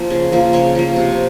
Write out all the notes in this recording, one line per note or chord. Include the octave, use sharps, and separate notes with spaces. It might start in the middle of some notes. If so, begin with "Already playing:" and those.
Already playing: F3 A#3
C#3
F3 A#3
C#3 C#5
F3 A#3
C3